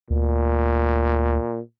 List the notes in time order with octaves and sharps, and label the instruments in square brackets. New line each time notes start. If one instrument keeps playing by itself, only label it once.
[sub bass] D2 [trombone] A#2